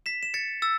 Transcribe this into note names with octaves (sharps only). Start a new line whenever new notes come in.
B6 E7
E7
A6 C#7
E6 A6